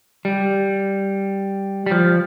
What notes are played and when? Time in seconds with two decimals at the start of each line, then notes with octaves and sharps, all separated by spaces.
0.25 G3
1.86 G3
1.91 F3